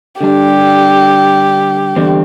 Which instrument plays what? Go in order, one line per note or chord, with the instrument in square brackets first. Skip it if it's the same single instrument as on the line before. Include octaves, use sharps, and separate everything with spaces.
[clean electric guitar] D3 G3 D4 [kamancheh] G4
[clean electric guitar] E2 D3 G3 C4